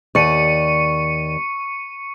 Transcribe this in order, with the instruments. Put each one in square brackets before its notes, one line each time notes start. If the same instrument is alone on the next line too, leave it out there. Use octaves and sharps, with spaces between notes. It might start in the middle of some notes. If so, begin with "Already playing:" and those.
[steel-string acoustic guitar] D#2 D5 [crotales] C#6 C#7 D#7